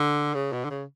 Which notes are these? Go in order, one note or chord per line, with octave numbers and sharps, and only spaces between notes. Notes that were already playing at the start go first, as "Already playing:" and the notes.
Already playing: D3
C#3
B2
D3
C#3